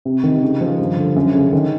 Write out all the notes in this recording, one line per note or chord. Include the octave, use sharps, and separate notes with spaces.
C3
D#3
C#3
F3
G2
D3
F#2
C#3
D#3